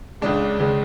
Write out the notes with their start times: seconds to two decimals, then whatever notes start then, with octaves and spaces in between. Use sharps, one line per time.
0.21 C#2 C#3 G#3 D4
0.59 C#2 C#3 G#3